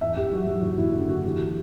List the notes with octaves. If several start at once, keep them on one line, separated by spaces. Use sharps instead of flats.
E2 E5
E2 G4
F#3 F#4
F#3 F#4
F#1 F#4
F#1 E4
D3 F#4
D3 F#4
E3 G4